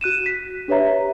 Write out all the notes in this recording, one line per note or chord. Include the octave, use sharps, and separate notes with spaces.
F#4 F#6 D#7 E7
B6
D4 G4 B4 C#5 E5 A#5